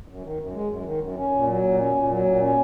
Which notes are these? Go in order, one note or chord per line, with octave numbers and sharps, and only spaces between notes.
F#2
D#3
F#2
G#3
F#2
D#3
F#2
C#4
A#2
F#3
A#2
C#4
A#2
F#3
A#2
C#4